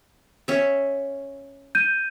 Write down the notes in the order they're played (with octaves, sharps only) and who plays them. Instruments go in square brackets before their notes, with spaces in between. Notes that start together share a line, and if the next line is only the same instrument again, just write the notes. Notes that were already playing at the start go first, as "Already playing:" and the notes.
[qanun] C#4 E5
[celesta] G6 D#7